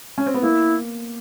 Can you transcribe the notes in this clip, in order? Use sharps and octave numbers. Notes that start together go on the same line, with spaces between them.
C#4
C4
B3
A#3 E4